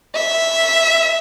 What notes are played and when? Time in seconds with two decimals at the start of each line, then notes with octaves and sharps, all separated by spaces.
0.15 E5